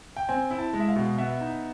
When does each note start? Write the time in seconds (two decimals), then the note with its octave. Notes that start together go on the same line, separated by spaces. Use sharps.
0.17 G5
0.29 C4 G#5
0.51 E4
0.58 A5
0.73 G#3
0.80 E5
0.88 F5
0.96 B2
1.18 B3 E5
1.41 D#4